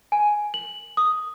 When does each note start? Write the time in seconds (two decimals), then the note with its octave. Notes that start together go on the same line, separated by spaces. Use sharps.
0.12 G#5
0.54 F#7
0.97 D#6